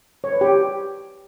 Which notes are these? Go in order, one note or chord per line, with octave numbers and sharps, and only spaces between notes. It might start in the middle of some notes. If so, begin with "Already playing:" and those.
C#5
B4
G4